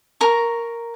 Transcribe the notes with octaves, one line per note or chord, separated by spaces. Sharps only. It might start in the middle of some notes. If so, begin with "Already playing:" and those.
A#4 A#5 C#6